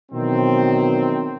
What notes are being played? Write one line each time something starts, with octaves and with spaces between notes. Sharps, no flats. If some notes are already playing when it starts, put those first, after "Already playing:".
B2 D#3 E3 F#3 C4